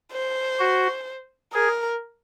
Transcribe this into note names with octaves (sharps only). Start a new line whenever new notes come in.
C5
F#4
G#4 A#4